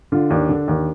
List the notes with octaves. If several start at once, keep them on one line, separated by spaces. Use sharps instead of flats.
D3 F4
D#2 D4
D3
D#2